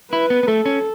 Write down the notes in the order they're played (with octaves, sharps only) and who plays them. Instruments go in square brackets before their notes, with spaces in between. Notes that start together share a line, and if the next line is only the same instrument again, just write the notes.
[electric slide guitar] E4 [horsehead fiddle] B4
[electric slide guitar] B3
B3
[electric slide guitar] A3 [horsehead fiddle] A4
[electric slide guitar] C#4